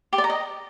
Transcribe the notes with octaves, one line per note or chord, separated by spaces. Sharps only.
G4
D5
A#5
D#5